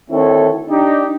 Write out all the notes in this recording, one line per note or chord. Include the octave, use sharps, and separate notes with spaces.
D2 D#3 C4 E4 A4 C#5
D4 D#4 G4